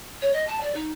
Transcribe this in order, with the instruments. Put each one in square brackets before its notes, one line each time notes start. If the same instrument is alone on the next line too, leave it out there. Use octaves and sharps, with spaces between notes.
[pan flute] C#5
D#5
A5
D5
D#4